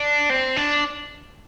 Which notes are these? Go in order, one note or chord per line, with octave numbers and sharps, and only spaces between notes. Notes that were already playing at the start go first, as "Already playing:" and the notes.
Already playing: D4
C4
D4